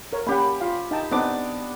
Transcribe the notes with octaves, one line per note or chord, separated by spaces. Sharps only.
A#4 C#5
A#3 C#4 G4 F#5 B5
F4 F5
D#4 G5 A5
B3 C4 D4 D#4 D6